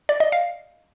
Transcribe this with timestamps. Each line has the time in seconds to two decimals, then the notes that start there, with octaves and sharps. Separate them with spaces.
0.09 D5
0.20 D#5
0.32 F5